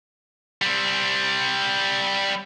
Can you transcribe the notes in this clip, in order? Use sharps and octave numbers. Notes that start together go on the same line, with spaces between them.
G3 C4